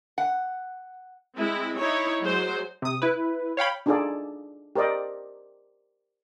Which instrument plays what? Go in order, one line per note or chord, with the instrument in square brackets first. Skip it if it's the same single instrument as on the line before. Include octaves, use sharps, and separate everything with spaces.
[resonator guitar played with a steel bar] F#5
[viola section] G#3 C4 E4
D#4 E4 C#5
F#3 G#3 C5
[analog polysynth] C3 D#6
E4 B4
C#5 F5 G5 B5
[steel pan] D4 D#4 F4 G#4 A4 D5
G4 A#4 C5 D5 D#5